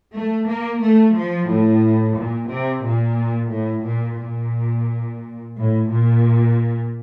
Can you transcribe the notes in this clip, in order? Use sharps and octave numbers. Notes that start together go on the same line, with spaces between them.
A3
A#3
A3
F3
A2
A#2
C3
A#2
A2
A#2
A#2
A2
A#2